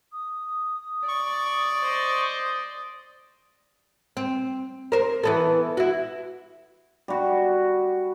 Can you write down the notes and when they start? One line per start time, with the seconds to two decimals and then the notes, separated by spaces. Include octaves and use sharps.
0.12 D#6
1.08 D5 C#6
1.82 C5 D#5
4.17 C4
4.92 A#4 C5
5.23 E3 B3 A4
5.77 E4 F#4
7.08 G3 F#4